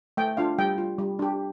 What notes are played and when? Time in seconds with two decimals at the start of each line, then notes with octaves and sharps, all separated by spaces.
0.17 A3 G5
0.37 D4 F4 F5
0.58 G3 G5
0.78 F4
0.98 G3
1.19 D4 G4